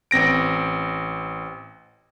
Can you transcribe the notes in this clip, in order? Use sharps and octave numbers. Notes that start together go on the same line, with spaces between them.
A1 C4 A#6 D7